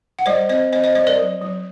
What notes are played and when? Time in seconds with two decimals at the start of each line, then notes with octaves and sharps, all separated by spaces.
0.19 F#5
0.26 G3 C5 D#5
0.49 C4 C5 D#5
0.72 C4 C5 D#5
0.84 C5 D#5
0.95 G3 C5 D#5
1.07 A#4 D5
1.19 F#3
1.42 F#3